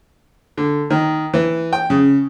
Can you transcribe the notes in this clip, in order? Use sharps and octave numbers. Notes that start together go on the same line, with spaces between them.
D3
D#3
E3
G5
C#3